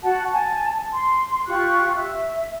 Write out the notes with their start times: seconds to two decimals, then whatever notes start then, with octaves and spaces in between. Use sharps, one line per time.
0.03 F#4 F#5 A5
0.32 G#5 A5
0.93 C6
1.47 F4 G4 C#6 F#6
1.95 E5